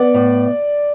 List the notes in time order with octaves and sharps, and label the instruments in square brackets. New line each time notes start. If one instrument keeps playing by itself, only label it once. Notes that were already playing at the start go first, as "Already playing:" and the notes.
Already playing: [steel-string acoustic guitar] B3 [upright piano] D5
[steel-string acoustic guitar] A2